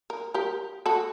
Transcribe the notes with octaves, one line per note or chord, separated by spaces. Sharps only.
A#4
G4 A#4
F#4 A4